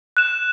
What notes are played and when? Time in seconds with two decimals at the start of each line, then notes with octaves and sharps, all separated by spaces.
0.17 F#6 E7